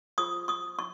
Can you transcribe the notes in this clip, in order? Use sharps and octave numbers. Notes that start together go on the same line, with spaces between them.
F4 G#4 C5 C#6 D#6
C#6 D#6
C#6